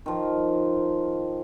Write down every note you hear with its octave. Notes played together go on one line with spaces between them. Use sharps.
D#3 F3